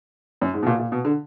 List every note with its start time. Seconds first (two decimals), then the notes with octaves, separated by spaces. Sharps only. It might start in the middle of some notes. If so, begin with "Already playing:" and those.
0.41 F#2
0.54 G#2
0.63 B2
0.66 A#2
0.79 A#2
0.92 B2
1.05 D3